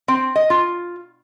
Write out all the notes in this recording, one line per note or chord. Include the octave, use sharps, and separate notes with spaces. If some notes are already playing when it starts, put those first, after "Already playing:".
C4
D#5
F4